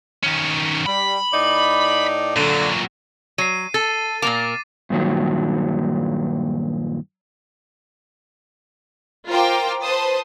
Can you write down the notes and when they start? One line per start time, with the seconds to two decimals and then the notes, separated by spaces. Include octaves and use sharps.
0.24 D#3 C#4
0.86 G3 B5
1.33 A2 D#4 D5
2.36 A#2 D3 F#3
3.38 F#3 C7 D#7
3.74 A4 A6
4.22 A#2 A#3 A#4 D6
4.90 G2 A#2 D#3 F#3
9.28 F4 A#4 C5 G5 D6
9.82 B4 C5 A5 D#6